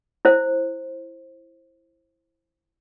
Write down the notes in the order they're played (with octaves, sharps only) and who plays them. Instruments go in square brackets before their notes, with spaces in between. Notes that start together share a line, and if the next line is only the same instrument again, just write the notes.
[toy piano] E4 C5